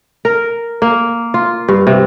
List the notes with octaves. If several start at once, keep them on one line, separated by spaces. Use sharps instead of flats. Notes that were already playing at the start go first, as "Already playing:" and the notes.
A#4
A#3
F4
G2
C3